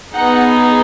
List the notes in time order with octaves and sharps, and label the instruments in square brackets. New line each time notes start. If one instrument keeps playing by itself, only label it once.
[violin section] B3 D#4 G#4 F#5